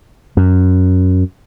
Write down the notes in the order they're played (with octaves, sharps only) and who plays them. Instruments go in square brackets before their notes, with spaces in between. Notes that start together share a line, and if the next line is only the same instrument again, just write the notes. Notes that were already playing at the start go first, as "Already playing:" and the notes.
[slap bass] F#2